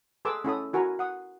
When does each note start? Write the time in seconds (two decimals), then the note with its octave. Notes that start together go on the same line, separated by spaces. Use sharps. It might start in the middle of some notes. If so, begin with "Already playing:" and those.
0.25 G#4 A4 B4 C6 D6 E6
0.45 C#4 E4 A4 D#6
0.73 E4 F#4 A#4 G#5 A#5
0.99 F#5 D#6